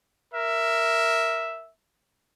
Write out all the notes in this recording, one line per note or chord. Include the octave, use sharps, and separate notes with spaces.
A#4 E5